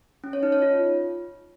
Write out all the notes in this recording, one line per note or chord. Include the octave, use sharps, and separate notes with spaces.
C#4
C#5
D#4
C#5
F4